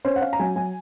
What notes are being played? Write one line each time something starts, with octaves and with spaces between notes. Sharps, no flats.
C#4 C5
F#5
C#4 F5
A#5
F#3 G#5
F#3 G#5